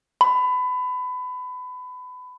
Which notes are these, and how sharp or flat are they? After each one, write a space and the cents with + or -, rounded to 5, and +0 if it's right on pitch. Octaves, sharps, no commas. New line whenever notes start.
B5 +25